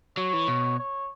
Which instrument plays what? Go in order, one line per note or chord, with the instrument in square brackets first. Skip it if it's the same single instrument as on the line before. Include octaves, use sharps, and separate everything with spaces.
[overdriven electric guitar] F#3 [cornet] C#5
[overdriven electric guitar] E3
B2
[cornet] C#5